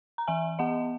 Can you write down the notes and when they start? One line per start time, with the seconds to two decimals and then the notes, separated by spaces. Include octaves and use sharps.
0.18 A#5
0.27 E3 E5 G#5
0.59 B3 D#5 F#5